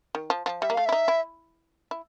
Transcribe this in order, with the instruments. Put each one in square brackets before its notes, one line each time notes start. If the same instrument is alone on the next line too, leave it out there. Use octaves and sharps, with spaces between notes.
[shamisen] D#3
F3
F3
[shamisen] G3 [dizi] E5
[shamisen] A#3
[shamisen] A3 [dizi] F5
[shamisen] E4 [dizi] E5
[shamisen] D#4
E4
E4